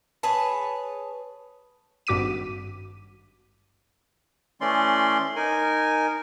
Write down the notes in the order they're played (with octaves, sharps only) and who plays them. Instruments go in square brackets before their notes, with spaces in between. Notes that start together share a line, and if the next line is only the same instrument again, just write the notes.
[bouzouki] G#4 B4 C#5 A5
[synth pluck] G#1 G2 F#4 D6 B6 D#7
[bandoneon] E3 A3 C#4 D5 C6
D#4 A#4 G#5